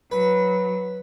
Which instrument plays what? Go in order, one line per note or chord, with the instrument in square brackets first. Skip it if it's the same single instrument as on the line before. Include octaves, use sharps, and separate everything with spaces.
[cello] F#3 [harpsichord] B4